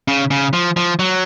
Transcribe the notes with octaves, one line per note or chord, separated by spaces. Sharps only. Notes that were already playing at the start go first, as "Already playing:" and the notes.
C#3
C#3
F3
F3
F#3